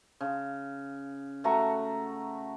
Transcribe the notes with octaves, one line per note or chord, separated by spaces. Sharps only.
C#3
A3 F#4 A#5 C#6